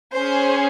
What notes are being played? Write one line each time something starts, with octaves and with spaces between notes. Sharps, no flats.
C#4 G#4 C5